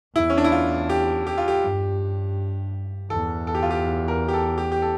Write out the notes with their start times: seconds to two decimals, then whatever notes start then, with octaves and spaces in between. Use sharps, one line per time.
0.16 E2 E4
0.30 C#4
0.38 D4
0.44 E4
0.52 F4
0.89 G4
1.27 G4
1.38 F4
1.48 G4
1.63 G2
3.10 E2 A4
3.47 A4
3.55 G4
3.63 F4
3.71 G4
4.08 A#4
4.28 G4
4.33 A4
4.58 G4
4.72 G4
4.82 A4